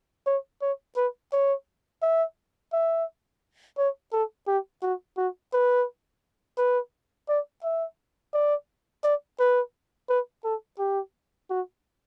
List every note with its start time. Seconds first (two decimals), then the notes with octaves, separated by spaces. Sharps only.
0.27 C#5
0.61 C#5
0.96 B4
1.32 C#5
2.02 E5
2.73 E5
3.78 C#5
4.12 A4
4.47 G4
4.83 F#4
5.17 F#4
5.53 B4
6.58 B4
7.29 D5
7.63 E5
8.34 D5
9.04 D5
9.40 B4
10.09 B4
10.44 A4
10.79 G4
11.50 F#4